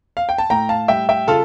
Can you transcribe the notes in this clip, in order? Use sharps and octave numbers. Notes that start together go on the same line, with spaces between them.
F5
G5
A5
A2 G5 A#5
F5 A5
G3 E5 G5
E5 G5
C#3 F4 A4